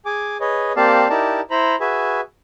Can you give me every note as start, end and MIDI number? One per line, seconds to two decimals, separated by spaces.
0.06 0.37 68
0.06 0.37 80
0.06 0.37 86
0.40 0.72 68
0.40 0.72 71
0.40 0.72 73
0.40 0.72 75
0.76 1.08 58
0.76 1.08 60
0.76 1.08 67
0.76 1.08 74
0.76 1.08 77
0.76 1.08 81
1.10 1.40 63
1.10 1.40 64
1.10 1.40 67
1.10 1.40 70
1.10 1.40 74
1.10 1.40 81
1.51 1.76 64
1.51 1.76 72
1.51 1.76 82
1.51 1.76 83
1.80 2.21 66
1.80 2.21 68
1.80 2.21 71
1.80 2.21 76
1.80 2.21 80